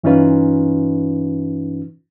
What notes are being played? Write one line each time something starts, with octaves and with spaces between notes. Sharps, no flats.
G2 E3 C#4 D#4 F4 B4